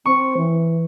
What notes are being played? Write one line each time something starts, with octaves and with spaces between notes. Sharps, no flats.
C4 C#6
E3